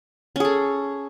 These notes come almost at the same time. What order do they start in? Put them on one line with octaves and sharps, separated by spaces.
C#4 G#4 A4